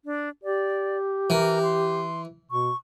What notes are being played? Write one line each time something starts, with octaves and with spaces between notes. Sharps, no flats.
D4
G4 D5
E3 A#4
C6
B2 C#6